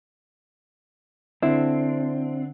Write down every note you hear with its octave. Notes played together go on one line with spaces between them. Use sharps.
D3 C4 D4 E4